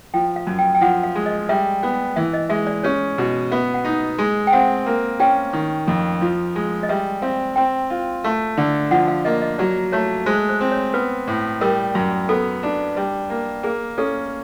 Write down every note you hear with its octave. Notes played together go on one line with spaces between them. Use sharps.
F3 G5
F5
F#2
G5
G5
F3 F#5
F5
G#3
D#5
G3 E5
B3
E3 E5
D#5
G#3 E5
D5
C#4 C#5
B2
B3 E5
F#5
D#4
G#3
G5
C4 F#5
A#3
C#4 G5
D#3
F2
F3
G#3
D#5
G3 E5
C4 F5
C4 G5
F4
A3
D3
F3 F#5
F5
A#3 D#5
D#5
F#3 D5
A3 C#5
G#3 C5
C5
C4
C#5
B3 B4
A2
G3 A#4
F#2
B3 A4
D4
G3
A#3
A#3 G#4
C#4 A4